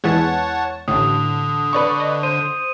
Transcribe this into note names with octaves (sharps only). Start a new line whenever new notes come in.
E2 E3 G#3 C#5 F#5 A5
A1 A2 D3 D#6
B4 D5 C#6
D#5
C5 D#7